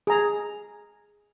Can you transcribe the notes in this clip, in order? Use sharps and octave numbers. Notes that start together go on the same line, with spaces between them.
G#4 A#5